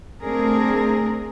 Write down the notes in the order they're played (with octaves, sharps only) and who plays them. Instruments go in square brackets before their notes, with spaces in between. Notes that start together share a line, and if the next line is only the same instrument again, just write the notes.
[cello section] A3 C4 D4 G#4 A#4